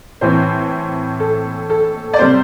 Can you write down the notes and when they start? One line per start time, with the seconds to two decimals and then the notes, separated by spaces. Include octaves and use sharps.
0.21 A2 E3 C4 C5
1.20 A4
1.70 A4
2.13 D5
2.19 C3 G3 C4 C5